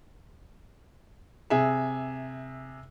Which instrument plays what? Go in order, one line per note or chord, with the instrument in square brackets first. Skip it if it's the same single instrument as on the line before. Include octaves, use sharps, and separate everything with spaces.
[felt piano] C3 G#4 E5